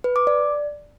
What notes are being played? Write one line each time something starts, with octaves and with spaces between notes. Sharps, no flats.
B4
D6
D5